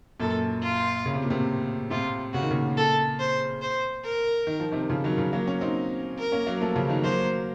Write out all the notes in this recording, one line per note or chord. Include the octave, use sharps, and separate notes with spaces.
F#2 A#2 A4
F4
C#3
C3
A#2
A2 C3
A2 C3 F4
C#3 F#4
D#3
A#2 C#3
A4
C5
C5
A#4
D#3
F3
C3 D#3
C#3 F3
D#3 F#3
C#3 F3
F#3 A#3
A#3 C#4
C4 D#4
A#4
A#3 C#4
F#3 A#3
F3 A3
C#3 F3
D#3 F#3
F#3 A#3 C5